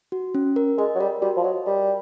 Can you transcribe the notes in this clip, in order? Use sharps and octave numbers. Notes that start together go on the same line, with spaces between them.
F#4
C#4
A#4
G#3 D#5
F#3
G3 A#4
G3 F#4
F3
F#3 D#5
G3 A#4